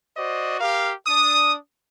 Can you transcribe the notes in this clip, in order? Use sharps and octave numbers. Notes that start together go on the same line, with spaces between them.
F#4 C5 D5 D#5
G4 A#4 F5
D4 D#6